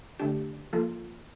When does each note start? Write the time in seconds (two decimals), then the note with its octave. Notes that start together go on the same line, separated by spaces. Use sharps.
0.19 D3 A3 D4 G4
0.73 F3 A#3 F4 A4